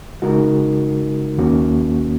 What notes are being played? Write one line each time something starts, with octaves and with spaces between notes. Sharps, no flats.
C#3 G#3 D#4 F#4 A#4
D#2 D#3 A#3 C#4 F#4